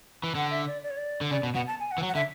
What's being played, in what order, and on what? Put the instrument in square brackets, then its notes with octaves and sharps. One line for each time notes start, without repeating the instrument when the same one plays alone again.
[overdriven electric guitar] E3
[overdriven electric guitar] D3 [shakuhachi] F#5
[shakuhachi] E5
D5
D5
C#5
D5
[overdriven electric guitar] D3
[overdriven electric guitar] C#3 [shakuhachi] D5
[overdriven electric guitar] B2
[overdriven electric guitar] B2 [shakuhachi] F#5
[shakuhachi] A5
G#5
F#5
[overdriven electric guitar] E3
F#3
[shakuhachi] F#5
[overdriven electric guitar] D3 [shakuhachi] E5